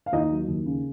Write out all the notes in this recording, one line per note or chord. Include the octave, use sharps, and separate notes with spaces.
F5
D#2 D#4 D#5
F#3
D#2
C#3